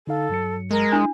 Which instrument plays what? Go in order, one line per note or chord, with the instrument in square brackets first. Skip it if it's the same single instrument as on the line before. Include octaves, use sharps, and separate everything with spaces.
[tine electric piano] D3 D#4 F5 [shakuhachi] A4
[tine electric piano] G2 F#3 C#7
[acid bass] G#3 [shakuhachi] A#4
[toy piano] D4 [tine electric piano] E4